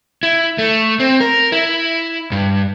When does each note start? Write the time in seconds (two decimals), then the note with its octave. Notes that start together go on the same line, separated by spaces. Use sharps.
0.23 E4
0.58 A3
1.00 C4
1.21 A#4
1.52 E4
2.32 G2